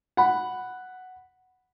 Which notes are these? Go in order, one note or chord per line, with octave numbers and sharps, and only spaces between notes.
F#5 B5